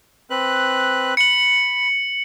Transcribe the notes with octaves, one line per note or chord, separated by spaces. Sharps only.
C4 B4 F#6
B5 C#7 F#7